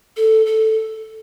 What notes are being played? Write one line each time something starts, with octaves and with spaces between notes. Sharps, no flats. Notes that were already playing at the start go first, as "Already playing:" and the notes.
A4
A4